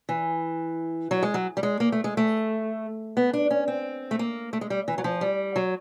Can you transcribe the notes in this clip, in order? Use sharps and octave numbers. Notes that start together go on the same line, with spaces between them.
E3
F#3
G#3
F#3
G3
G#3
A#3
A3
G#3
A3
B3
D4
C#4
C4
A3
A#3
A3
G#3
G3
E3
F#3
F3
G3
F#3